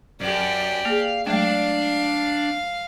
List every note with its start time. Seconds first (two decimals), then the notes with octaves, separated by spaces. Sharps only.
0.21 F#2 G4 D5
0.85 A#3 G#4 F5
1.27 F#3 G#3 A3 D4 F5